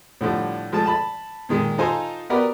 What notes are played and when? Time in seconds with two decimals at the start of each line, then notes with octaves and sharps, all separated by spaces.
0.21 A2 D3 F3 G3
0.72 F3 G#3 A3 A5
0.86 A5 B5
1.49 A#2 D#3 G#3
1.78 D#4 F4 A4 C5 G#5 A#5
2.30 B3 F#4 G4 A#4 B4 D5